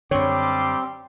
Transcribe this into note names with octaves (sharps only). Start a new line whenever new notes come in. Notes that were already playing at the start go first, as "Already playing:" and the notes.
F#2 D3 G3 C4 C#5 C6 D6